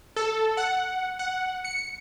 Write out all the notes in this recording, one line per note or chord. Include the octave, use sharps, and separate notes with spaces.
A4
F#5
F#5
C#7